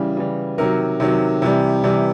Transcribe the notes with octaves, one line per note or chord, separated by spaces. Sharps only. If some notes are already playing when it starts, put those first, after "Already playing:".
Already playing: C#3 E3 G3
C#3 E3 G3
C3 D#3 F#3 A#4
C3 D#3 F#3
C3 E3 G3
C3 E3 G3